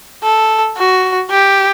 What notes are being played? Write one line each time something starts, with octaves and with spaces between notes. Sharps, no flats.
A4
F#4
G4